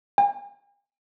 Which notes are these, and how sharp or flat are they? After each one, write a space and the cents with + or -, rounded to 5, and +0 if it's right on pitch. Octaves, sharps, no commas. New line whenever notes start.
G#5 -45